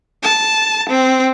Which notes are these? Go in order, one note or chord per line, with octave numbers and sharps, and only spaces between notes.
A5
C4